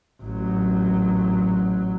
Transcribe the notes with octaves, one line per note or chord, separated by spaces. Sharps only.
A1 F#3